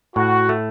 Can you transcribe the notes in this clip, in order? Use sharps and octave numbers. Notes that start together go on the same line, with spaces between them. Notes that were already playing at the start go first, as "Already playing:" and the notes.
A2 F#4
A3